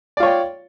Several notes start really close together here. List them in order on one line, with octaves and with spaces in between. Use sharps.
D5 F4 C#5 G5